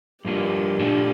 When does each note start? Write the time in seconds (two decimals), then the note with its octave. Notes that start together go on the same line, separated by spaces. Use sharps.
0.25 G2 F3 A#3 D4 F4 G4
0.79 A#2 A3 D4 F4